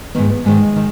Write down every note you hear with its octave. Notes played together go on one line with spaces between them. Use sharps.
G#2 D#3 B3
B3
G#2 D#3 G#3
D#3